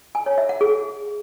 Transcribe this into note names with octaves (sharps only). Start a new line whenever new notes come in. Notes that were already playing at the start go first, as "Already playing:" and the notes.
G#5
C#5
E5
F#5
G#4